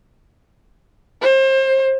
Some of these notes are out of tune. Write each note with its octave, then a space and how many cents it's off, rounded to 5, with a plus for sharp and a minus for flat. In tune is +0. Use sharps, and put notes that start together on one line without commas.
C5 +30